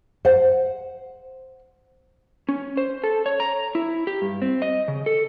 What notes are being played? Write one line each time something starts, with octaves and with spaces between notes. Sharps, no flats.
C5 F#5
C#4
C5
A4
C#5
A#5
E4
G4
G2
C4
D#5
C#3
A4